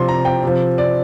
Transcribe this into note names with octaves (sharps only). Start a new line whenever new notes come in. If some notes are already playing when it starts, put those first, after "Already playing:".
Already playing: C3 F3 C6
A#5
G5
C3 F3
D5